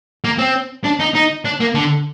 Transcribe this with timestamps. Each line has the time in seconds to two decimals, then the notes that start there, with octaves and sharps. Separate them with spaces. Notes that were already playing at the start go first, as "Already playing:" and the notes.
0.24 A#3
0.39 C4
0.84 D4
0.99 D#4
1.14 D#4
1.45 D4
1.60 A#3
1.75 D3